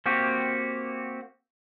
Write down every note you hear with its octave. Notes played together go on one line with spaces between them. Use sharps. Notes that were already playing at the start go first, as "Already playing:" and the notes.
A#3 C4 F#4 G4